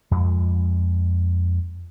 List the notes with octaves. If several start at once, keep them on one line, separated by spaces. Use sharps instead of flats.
F2 G#3